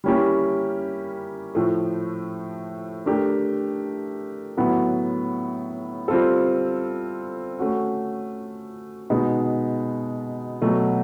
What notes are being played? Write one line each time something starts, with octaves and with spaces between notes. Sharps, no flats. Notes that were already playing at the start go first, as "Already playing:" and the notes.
G3 A#3 C#4 E4 G4
A2 F3 A3
A3 D4 G4 A#4
A2 F#3 B3
G3 C4 F4 A4
A3 C#4 F#4
B2 G#3 B3 D#4
B2 F#3 A3